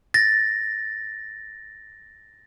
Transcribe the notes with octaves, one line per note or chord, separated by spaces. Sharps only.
A6 A#6